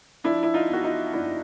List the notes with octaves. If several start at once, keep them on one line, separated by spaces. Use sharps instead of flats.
F3 D4 E4
E4
D#4 F4
E2 F#4
D#4 F4
F#1 D4 E4